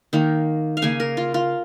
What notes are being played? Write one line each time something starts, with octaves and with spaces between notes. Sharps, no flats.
D#3 A#3
F5
C#3 A#3 G#5
A#4
F4
F4